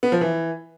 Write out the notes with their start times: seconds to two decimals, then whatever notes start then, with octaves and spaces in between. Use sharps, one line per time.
0.03 B3
0.12 F3
0.21 E3